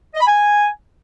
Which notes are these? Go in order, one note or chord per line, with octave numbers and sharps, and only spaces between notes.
D#5
B5
G#5